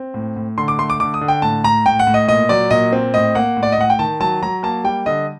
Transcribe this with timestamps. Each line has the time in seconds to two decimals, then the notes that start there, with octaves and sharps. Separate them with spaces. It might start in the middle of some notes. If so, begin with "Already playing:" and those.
Already playing: C4
0.14 A2
0.36 A2
0.58 D3 C6
0.68 D6
0.79 A3 C6
0.90 D6
1.00 D3 D6
1.14 D#6
1.21 D3
1.28 G5
1.42 A2 A5
1.64 A2 A#5
1.86 A2 G5
1.99 F#5
2.07 A2
2.14 D#5
2.28 A#2 D#5
2.49 F#3 D5
2.70 A#2 D#5
2.92 C4
3.14 A2 D#5
3.35 A#3 F#5
3.57 A2
3.63 D5
3.72 D#5
3.78 A2 F#5
3.90 G5
3.99 D#3 A5
4.20 F#3 A5
4.42 F#3 A#5
4.63 A#3 A5
4.84 G3 G5
5.06 D3 D#5